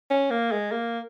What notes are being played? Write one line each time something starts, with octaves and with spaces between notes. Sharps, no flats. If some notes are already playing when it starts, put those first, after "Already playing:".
C#4
A#3
G#3
A#3